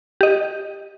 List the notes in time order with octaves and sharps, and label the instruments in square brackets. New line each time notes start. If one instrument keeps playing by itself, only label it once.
[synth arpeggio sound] G4 D#5